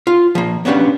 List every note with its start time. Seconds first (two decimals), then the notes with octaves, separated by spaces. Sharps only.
0.07 F4
0.35 F3 A#3
0.65 A#3 B3 C#4 D4 G4